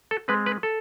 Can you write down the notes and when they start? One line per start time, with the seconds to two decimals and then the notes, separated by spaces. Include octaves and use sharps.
0.11 A4
0.28 G#3 C4 B4
0.46 B4
0.63 A4